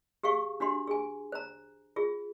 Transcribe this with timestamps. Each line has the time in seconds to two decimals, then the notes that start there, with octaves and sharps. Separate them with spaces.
0.23 G4 G#4 F5 C#6
0.60 D4 F#4 G4 C6
0.88 G#4 G#5
1.32 C5 A#5
1.96 F4 G#4